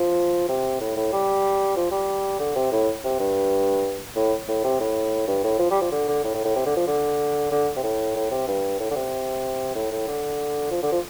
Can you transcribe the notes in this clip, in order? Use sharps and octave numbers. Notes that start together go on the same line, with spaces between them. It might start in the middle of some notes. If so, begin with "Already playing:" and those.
Already playing: F3
C3
A2
A2
G3
F3
G3
D3
C3
A2
C3
G2
A2
A2
C3
A2
G2
A2
F3
G3
F3
D3
D3
A2
A2
A2
C3
D3
F3
D3
D3
C3
A2
A2
C3
G2
A2
D3
C3
A2
A2
D3
F3
D3
F3